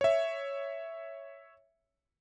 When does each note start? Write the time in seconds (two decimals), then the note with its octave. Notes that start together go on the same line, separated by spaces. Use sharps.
0.01 C#5 E5